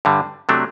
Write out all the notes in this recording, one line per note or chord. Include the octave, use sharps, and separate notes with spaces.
G2 D3 G3
C3 F#3 A3 D4